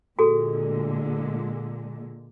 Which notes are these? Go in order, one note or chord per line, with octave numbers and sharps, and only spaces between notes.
A#2 D3 G#3 F#4 G#4 A4